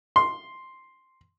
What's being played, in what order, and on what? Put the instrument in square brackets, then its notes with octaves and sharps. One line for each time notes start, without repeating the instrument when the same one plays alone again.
[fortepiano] C6